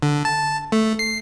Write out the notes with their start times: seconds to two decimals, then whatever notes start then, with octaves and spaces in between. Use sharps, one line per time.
0.02 D3
0.25 A5
0.72 A3
0.99 C7